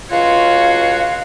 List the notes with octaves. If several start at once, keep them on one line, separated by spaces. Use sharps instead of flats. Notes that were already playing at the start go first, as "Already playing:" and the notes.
C#2 F4 F#4 C#5 F5